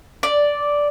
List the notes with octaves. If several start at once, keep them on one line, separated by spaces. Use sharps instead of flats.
D5